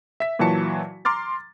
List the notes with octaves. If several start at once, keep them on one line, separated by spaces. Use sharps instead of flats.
E5 B6
A#2 E3 F#3 F#4 A5 C#7
A#5 C6 D6 F6 A6